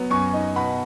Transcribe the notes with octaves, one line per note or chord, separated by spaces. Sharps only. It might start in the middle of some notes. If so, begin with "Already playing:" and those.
Already playing: F#3 B3
F#2 G#5 C#6
D#4
B2 F#5 B5